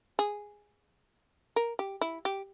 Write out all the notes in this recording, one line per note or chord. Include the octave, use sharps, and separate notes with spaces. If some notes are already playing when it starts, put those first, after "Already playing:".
G#4
A#4
G4
E4
G4